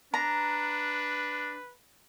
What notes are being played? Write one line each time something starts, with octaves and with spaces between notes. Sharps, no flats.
D4 B4 A#5